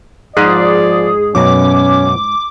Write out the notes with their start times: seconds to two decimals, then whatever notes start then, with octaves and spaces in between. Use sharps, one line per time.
0.37 G#2 F3 G#4 D5
1.35 F#2 B2 F#3 C#4 D6